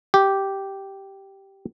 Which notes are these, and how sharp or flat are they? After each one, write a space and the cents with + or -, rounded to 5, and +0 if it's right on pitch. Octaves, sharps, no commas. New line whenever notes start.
G4 -10